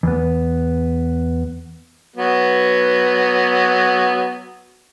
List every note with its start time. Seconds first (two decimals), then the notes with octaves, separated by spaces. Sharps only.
0.03 E2 B3
2.16 F#3 B3